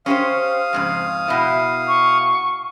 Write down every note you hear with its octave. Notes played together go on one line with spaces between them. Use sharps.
C#4 G4 C5 F5 D#6
F2 G#2 C#3
B2 E4
C#6